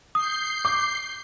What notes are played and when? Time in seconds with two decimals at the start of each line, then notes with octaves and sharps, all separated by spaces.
0.15 D#6 G6 C7
0.65 D6